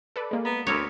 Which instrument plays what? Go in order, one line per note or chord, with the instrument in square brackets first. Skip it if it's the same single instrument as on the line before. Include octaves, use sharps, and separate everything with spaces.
[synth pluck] A4 B4 D5
G#3 A#3
[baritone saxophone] B3 [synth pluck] A#5
[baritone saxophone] D2 [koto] A4 A#4 C#5